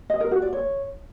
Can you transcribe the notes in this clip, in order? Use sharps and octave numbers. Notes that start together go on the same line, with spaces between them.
D#5
A#4
F#4
D5
C#5